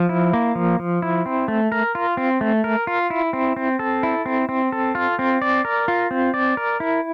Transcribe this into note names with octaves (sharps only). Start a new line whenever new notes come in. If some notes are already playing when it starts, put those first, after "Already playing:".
Already playing: F3
E4
A#3
F3
F3
E4
C4
A3
A#4
F4
C4
A3
A#4
F4
E4
C4
C4
A4
E4
C4
C4
A4
F4
C4
D5
A#4
F4
C4
D5
A#4
E4